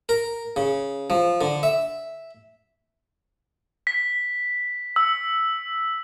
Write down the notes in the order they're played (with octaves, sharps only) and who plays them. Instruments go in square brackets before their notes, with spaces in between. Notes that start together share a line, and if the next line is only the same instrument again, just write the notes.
[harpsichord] A#4
C#3
F3
D3
E5
[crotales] B6
E6